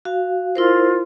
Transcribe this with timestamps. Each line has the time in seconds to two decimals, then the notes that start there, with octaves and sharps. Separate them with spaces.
0.05 F#4 F5
0.56 E4 F4 A#4 C5